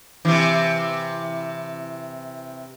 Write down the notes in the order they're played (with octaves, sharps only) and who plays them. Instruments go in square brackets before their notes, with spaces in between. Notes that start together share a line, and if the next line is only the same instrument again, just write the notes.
[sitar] C3 E3